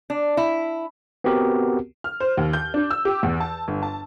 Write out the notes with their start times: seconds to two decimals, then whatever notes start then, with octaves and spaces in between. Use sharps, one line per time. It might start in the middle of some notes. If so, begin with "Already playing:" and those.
0.10 D4
0.37 E4
1.24 B3 C4 F#4 G4 A#4
2.04 F6
2.20 C5
2.37 D#2
2.53 G6
2.74 D4
2.91 E6
3.05 G4
3.23 E2
3.40 A5
3.68 G1
3.83 A5